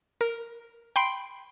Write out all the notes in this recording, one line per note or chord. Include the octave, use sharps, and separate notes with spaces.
A#4
G5 B5 C6 C7 D7